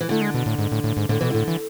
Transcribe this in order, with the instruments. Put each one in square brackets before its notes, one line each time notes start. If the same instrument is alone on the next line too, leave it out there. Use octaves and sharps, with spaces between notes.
[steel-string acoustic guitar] E3
[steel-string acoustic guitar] D3 [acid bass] A3
[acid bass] G#3
B2
A2
G#2
A2
A2
G#2
[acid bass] A2 [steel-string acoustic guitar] D3
[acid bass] B2 [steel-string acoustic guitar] E3
[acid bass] A2 [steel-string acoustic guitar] D3
[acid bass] E3